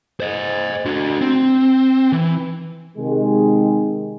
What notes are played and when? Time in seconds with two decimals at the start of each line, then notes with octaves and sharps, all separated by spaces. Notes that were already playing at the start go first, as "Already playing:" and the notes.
0.20 C5 D#5
0.85 D4 F#4
1.21 C4
2.12 E3
2.98 C3 D#3 G#3